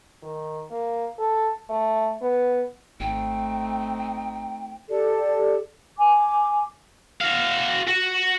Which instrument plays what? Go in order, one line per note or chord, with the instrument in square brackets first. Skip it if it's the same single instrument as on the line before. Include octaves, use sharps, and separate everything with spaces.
[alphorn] D#3
A#3
A4
A3
B3
[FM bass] G#1 [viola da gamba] A3 C4 [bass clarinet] D#4 [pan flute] G5
[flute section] G4 A4 D5
G#5 D6
[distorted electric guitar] F#4 F5
F#4